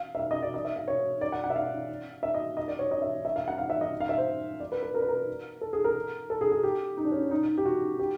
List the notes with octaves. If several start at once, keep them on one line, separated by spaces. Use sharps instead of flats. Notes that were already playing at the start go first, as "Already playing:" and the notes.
Already playing: F5
E5
F5
D#5
D5
D#5
E5
F5
C#5
D5
F#5
F#5
E5
F5
E5
D#5
D#5
D5
C#5
D#5
E5
E5
F5
F#5
F5
E5
D#5
F5
E5
C5
D5
B4
B4
A#4
B4
A#4
A4
G#4
A#4
A4
G#4
G#4
G4
D#4
D4
C#4
D4
D#4
D#4
G4
F#4
G4